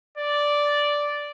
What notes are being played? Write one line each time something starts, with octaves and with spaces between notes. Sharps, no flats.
D5